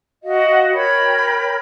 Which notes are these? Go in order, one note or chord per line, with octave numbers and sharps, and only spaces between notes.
F#4 D#5 F5
A#4 C#5 G5 B5